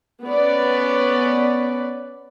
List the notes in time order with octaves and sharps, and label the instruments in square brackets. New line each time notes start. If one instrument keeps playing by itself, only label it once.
[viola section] B3 C#4 B4 D5